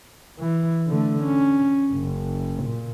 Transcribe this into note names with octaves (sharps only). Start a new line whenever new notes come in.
E3
D3 A3
C#4
F#1
A#2